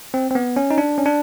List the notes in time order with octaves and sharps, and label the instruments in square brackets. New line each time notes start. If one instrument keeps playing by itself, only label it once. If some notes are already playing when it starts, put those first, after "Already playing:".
[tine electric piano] C4
C4
B3
C#4
D#4
D4
C#4
D4